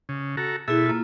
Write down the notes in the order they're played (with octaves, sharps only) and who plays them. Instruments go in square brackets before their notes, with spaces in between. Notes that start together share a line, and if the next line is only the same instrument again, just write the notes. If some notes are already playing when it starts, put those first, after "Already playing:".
[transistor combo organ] C#3
F#4 A4 A#5
[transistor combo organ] B2 A4 E5 [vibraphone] E4 G#4
[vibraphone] A#3 F4